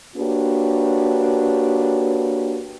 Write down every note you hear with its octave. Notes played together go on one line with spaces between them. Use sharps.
A#3 D4 F#4 G4 B4 C#5